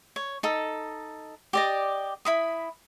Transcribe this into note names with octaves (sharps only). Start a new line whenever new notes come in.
C#5
D#4 A4
G4 D5 D#5
E4 B5 D#6